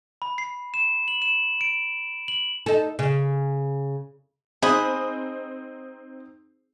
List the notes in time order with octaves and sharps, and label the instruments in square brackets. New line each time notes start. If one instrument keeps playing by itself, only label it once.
[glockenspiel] B5
C7
E7
F#7
E7
D7
F#7
[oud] D#4 A4
C#3
[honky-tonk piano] C4 D#4 C5 [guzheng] G#4 [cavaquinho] D#5 F#5 B5